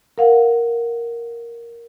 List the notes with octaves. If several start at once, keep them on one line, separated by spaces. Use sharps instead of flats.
A#4 F5 F#5